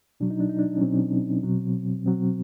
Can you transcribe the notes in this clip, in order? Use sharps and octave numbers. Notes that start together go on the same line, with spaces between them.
B2 F#3 D4
D#4
D4
D#4
D4
C#4
B2 F#3 C4
B2 F#3
B2 F#3 C4